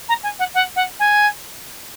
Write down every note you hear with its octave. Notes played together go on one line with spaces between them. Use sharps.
A#5
G#5
F#5
F#5
F#5
G#5